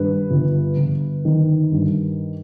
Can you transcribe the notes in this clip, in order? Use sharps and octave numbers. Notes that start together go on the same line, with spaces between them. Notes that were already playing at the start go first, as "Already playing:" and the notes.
Already playing: G2 D#3 B4
G1
G1
D#3
G2